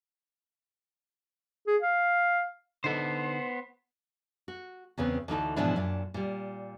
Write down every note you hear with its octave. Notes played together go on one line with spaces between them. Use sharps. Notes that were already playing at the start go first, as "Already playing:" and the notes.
G#4
F5
D3 B3 D#4 A4 C5
F#4
E2 C#3 B3 C4
D2 E3 D#4 A5
G#2 B2 E3 F3 D4 E4
F#2 A#2 D4
A#2 G3